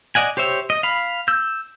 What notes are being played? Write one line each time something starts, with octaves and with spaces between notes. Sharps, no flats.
D5 D#5 F#5 G#5
G4 C5 C#5 E5
D#5
F5 B5
E6 G6